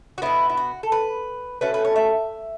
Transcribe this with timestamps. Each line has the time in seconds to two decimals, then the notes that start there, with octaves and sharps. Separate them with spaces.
0.18 F#4
0.22 B2 B3 E4
0.50 E4
0.57 F#4
0.83 A4
0.92 B4
1.61 B2 A3 C#4 B4
1.74 B4
1.85 C#5
1.96 E5